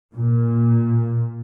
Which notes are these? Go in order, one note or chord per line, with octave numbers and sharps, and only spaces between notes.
A#2